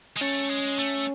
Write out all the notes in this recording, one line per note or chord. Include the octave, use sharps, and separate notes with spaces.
G#3
A3 C#4
G#3
A3